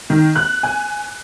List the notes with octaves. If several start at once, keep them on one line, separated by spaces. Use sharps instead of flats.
D#3
F#6
G#5